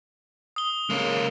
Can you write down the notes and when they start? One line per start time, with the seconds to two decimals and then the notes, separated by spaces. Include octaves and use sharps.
0.56 D#6 G7
0.90 C#3 G#3 A#3